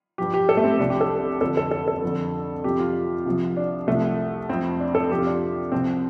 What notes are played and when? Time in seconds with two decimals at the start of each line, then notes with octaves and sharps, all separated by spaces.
0.18 G2 F3 G4
0.34 G4
0.49 A4
0.57 A3
0.64 C4
0.79 C2 C3 F3 D4
0.90 G4
1.01 A4
1.41 F2 D3 F3 A4
1.57 A4
1.71 A4
1.88 A4
2.02 F2 D3 F3
2.64 F2 C3 F3 G4
2.79 F4
3.26 C2 C3 F3
3.57 D4
3.87 C2 C3 F3 A3
4.49 F2 F3 C4
4.80 D4
4.95 A4
5.11 F2 C3 F3 G4
5.19 F4
5.26 D4
5.72 C2 C3 F3 C4